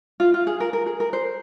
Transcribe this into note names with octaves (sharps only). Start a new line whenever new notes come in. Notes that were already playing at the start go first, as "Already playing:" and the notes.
F4
F4
G#4
A#4
A#4
G#4
A#4
C5